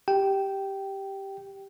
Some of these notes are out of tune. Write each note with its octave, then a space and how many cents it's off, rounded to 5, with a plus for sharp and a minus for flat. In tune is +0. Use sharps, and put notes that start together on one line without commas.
G4 +0 G5 -10